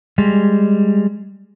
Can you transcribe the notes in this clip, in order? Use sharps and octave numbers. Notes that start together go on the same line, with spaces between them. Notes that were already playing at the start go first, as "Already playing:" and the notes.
G3 G#3